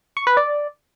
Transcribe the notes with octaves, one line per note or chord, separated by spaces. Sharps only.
C#6
B4
D5